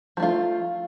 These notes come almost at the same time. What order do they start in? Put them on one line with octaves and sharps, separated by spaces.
F3 A3 F4